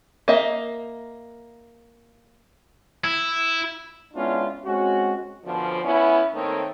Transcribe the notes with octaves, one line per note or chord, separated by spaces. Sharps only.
A#3 D#5 E5
E4
G#3 B3 C#4 D4 E4 F4
G#3 C4 C#4 F#4
F#2 B2 D3 F3
B3 C#4 E4
D#3 A3 A#3 C4 D#4 C#5